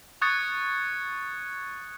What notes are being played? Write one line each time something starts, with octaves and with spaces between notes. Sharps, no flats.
C#6 D#6 F#6 G#6 A6 C#7